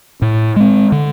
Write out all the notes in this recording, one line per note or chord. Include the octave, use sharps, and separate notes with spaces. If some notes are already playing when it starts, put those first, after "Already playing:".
A2
G#3 C4
D3